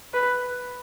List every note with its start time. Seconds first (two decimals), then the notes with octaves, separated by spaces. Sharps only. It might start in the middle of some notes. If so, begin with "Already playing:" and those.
0.14 B4